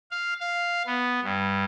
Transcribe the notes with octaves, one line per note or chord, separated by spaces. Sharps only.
F5
F5
B3
G2